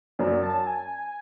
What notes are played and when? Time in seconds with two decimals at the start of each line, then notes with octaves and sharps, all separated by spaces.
0.19 F#2 F#3 D5
0.43 A5
0.67 G#5